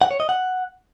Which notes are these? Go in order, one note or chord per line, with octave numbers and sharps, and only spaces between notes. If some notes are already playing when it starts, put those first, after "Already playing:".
F#5
C#5
D#5
F#5